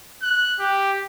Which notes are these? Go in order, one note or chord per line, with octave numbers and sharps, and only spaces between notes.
F#6
G4